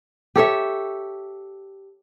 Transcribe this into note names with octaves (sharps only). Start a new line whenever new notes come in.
G4 A4 C#5 E5